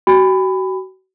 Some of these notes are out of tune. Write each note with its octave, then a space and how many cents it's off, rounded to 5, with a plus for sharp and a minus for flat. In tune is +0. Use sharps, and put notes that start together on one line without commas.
F#4 +30 G#5 -45 B5 +15